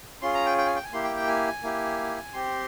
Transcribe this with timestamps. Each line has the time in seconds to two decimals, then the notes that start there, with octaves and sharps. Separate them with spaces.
0.22 C#4 F4 G#4 C6
0.34 A#5
0.46 G5
0.58 G5
0.66 G#5
0.75 G5
0.84 G#5
0.92 A#3 E4 G4 C6
1.04 G5
1.16 G5
1.27 G#5
1.63 A#3 E4 G4
2.33 C4 G4 C6